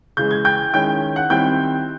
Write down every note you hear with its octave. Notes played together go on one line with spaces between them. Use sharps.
C#3 E3 G#3 G6
G#6
G5 G6
D#3 G#3 C#4 E4 G5 G6
F#5 F#6
D#3 G3 C4 E4 G5 G6